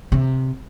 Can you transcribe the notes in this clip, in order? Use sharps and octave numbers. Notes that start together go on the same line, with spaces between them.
C3